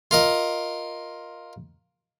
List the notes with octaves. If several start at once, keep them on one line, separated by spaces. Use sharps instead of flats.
F4 A#4 D#5